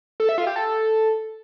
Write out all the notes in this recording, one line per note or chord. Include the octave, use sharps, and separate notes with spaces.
A4
E5
F4
G4
A4